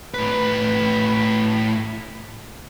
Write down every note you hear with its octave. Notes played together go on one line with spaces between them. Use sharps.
A2 B4